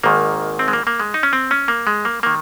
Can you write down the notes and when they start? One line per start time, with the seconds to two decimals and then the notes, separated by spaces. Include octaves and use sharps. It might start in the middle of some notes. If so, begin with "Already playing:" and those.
0.04 G#1 G#2 D#3 A#3
0.59 C4
0.68 G#3
0.73 A#3
0.87 A#3
1.00 G#3
1.14 D#4
1.23 C#4
1.33 C4
1.51 C#4
1.68 A#3
1.87 G#3
2.05 A#3
2.23 D#3 A#3